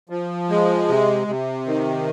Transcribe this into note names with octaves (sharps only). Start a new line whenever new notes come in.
F3
G#3
C3
C3
D#3